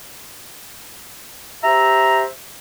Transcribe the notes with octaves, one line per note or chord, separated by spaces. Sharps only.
G4 C5 E5 A#5